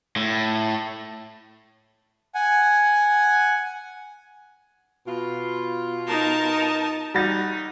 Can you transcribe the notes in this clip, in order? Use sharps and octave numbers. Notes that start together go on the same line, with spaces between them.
A2
F#5 G#5
B2 F4
D#4 A#4 A5
G3 D#4 F#4 A6